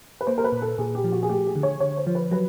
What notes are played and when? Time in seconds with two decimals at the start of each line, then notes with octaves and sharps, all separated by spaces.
0.21 B4
0.27 A#3 C5
0.38 A#4
0.44 B4
0.52 A#2
0.62 A4
0.78 A#2 G#4
0.95 G4
1.04 F3
1.12 F#4
1.23 G#4
1.29 A3 G4
1.47 G#4
1.55 D3
1.63 C#5
1.80 D3 C#5
1.97 C5
2.07 F3
2.15 B4
2.31 F#3 B4